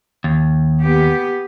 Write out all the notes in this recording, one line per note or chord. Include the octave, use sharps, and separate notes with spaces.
D#2
B3 G4